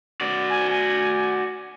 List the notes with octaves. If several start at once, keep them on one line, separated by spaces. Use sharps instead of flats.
F#4 D5
G#5
G#5